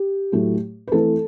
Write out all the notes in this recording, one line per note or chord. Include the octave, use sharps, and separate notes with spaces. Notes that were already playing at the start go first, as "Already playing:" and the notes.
Already playing: G4
A2 F#3 A3
B4
E3 A3 C4 A4